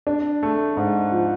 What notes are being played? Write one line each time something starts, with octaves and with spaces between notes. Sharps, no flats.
D4
A3
G#2
F3